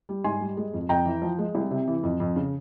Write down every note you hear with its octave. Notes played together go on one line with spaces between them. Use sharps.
G3
G#2 G#5 C6
G3
G#3
F2
F2 G5 A#5
E3
F3
G#3
C2
C3
E3
F2
F2
C#3